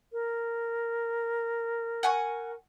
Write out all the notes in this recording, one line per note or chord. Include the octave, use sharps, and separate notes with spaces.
A#4
F#5 G#5 C#6